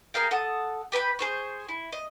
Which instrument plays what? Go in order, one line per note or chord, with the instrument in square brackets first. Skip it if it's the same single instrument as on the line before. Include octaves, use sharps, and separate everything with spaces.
[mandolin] G#4 A#4 F5 G5
A4 F#5 A5 D#6
G4 B4 G5 B5
G#4 C5 C#6
E4
D#5